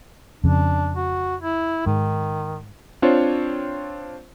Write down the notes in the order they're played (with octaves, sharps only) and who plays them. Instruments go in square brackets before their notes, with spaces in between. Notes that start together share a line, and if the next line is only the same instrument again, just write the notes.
[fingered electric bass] F2 C#3 [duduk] D4
[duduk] F#4
E4
[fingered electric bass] G#2 [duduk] D#3
[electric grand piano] C4 D4 F4 C5 C#5